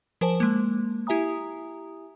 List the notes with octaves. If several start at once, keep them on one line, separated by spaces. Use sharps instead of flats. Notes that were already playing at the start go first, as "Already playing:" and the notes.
F3 A#4 C5 G#5 A5
G#3 A#3
E4 G4 E5 G#5 A#5 D#6